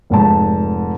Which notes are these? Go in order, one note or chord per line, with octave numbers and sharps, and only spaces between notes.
F1 G#2 A5